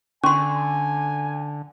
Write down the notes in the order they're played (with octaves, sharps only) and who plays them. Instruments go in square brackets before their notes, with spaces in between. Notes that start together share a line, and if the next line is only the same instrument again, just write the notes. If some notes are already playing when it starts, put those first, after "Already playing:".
[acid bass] D3 [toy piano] C#4 C6 [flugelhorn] G#5 [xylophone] C#6